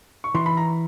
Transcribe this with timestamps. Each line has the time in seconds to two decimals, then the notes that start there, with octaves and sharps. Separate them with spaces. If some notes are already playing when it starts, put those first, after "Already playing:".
0.24 C#6
0.35 E3 C6
0.46 B5
0.57 A#5